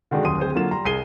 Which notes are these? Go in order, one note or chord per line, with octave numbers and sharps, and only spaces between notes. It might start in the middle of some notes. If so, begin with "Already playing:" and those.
D3 D#3 G#3 D4 F#4
D#1 F#2 C6 D#6 D#7
D1 C4 G#4 C5
D3 F#3 A#3 F4 E7
G3 A#5 C6
C2 G#4 C7 D#7 G7